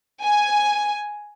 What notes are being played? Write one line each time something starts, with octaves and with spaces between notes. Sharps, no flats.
G#5